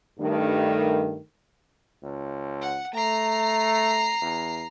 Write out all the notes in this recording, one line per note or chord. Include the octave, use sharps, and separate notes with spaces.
G2 D#3 A3
C#2
F#5
A3 A#5 C7
E2